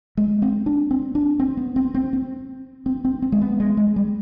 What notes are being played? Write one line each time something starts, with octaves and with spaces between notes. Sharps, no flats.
G#3
C4
D4
C4
D4
C4
B3
C4
C4
C4
C4
C4
C4
G#3
B3
G#3
G#3
G3